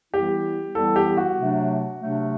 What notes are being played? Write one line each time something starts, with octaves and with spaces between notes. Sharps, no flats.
E3 G3 B3 E4 G4
E3 G3 B3 E4 A4
G4
F#4
C3 F#3 A3 D4
C3 F#3 A3 D4